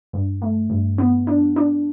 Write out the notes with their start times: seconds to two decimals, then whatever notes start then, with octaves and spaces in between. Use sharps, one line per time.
0.13 G2
0.42 A3
0.70 G2
0.98 B3
1.27 D4
1.56 D4